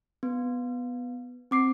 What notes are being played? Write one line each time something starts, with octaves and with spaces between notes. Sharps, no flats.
B3
C4 D6 C7